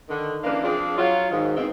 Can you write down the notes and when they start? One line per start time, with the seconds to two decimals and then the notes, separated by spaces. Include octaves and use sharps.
0.09 D3 D#3
0.43 C#3 E3 A#3 D4 B4 F5
0.63 F3 C4 D4 F4 G#4
0.97 F#3 F4 C#5
1.30 G#2 D#3
1.56 G#2 B2 E3 G#3 C4